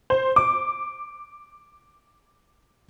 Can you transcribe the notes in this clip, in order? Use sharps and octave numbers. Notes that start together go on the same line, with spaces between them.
C5
D6